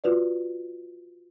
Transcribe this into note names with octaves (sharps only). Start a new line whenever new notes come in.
F4 F#4 B4 D5